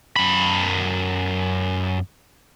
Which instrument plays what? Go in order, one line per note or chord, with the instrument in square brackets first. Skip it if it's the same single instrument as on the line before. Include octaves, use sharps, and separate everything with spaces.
[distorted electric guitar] F#2 B5